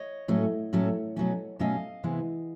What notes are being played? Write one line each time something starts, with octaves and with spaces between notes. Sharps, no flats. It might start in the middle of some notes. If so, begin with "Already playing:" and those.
Already playing: C#5 D#5
A2 F#3 A3 C#4
A2 F#3 A3 C#4
B2 F#3 A3 C#4
B2 F#3 A3 C#4 D#5 F5
C3 E3 G#3 B3